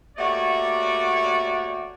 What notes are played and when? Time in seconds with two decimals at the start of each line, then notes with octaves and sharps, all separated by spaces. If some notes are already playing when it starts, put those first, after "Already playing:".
0.17 A3 A#3 F#4 G4 C#5 D5